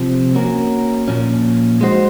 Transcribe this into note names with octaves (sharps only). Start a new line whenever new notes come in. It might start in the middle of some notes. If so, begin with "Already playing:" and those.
Already playing: C3 F3 C4
A#3 C#4 F#4 A#4
A#2 F3 A#3 C#4
G#3 D#4 F#4 C5